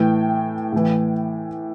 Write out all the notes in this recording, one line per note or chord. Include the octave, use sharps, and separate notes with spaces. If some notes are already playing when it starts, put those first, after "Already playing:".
Already playing: A2 E3 G5
A2 E3